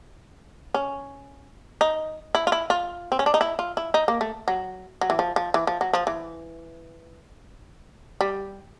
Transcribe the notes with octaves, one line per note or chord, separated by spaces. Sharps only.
C#4
D#4
E4
F4
E4
F4
C4
C#4
D4
D#4
E4
F4
E4
D#4
A#3
A3
F#3
F#3
E3
F3
F3
E3
F3
F#3
F3
E3
G3